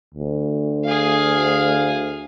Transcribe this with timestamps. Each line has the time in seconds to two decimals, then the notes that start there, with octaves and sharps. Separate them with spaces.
0.15 D2
0.85 G#4 F5